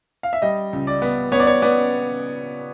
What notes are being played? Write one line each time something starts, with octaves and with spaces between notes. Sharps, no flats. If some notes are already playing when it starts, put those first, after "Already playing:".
F5
E5
G3 D#5
C#2
D5
B3
B3 C#5
D5
C#5
B3 D5